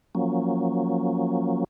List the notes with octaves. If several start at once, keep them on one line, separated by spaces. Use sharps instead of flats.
F3 F#3 A#3 C#4